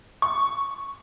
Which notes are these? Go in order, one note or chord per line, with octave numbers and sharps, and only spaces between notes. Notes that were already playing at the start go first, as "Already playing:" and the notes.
C#6